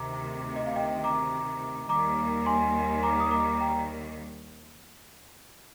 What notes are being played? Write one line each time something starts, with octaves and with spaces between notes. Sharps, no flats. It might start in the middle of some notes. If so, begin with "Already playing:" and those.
Already playing: D2 C3 D#3 A#5 D6
D#5
F5
D#5 G5
A#5 D6
D#2 D#3 G3 A#3 A#5 D6
G#5 C6
A#5 D6
D#6
A#5 D6
G5 A#5